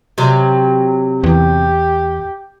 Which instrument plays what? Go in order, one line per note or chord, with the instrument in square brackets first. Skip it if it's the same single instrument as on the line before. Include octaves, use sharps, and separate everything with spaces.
[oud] C3 F#3
[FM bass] E2 [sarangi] G4